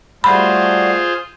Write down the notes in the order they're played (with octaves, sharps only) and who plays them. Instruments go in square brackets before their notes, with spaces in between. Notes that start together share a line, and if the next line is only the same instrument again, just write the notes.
[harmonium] G3 A3 F#4 [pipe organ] F4 G#4 C5 [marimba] B5